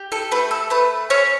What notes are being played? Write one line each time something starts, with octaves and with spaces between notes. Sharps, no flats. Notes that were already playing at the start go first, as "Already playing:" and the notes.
Already playing: G4
A4
A3 B4
A4
A3 B4
C#4 C#5